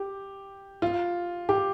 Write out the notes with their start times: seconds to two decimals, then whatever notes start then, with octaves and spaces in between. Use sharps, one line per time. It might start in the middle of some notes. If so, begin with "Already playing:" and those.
Already playing: G4
0.82 F4
1.49 G4